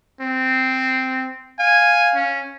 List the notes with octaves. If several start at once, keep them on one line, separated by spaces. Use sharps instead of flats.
C4
F5 G#5
C#4